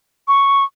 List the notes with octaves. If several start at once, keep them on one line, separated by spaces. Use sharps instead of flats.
C#6